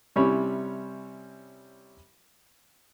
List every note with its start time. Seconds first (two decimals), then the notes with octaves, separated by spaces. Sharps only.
0.16 C3 G3 C#4 E4 C#5 B5